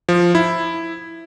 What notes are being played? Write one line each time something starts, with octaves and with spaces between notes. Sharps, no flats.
F3
E4